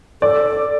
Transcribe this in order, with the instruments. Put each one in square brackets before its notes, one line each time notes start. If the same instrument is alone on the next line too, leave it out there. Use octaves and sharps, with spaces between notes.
[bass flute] A4 [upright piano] D5